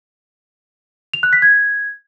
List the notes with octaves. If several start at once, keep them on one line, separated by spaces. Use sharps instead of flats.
F7
F#6
B6
G#6